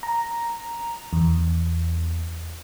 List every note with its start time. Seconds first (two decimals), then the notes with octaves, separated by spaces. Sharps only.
0.03 A#5
1.13 E2